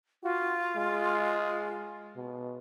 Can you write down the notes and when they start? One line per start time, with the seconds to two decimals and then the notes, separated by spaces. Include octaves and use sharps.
0.24 F4 F#4
0.76 G#3
2.16 B2